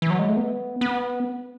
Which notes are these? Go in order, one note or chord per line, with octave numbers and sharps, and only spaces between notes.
E3
F#3
G#3
A3
B3
B3